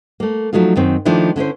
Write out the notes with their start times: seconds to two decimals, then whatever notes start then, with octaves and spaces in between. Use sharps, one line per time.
0.20 A3 A#3
0.53 F3 F#3 A3 D#4 F4
0.76 F#2 D#3 C4
1.05 D#3 F3 A3 A#3 D4 E4
1.36 D3 C#4 E4 C5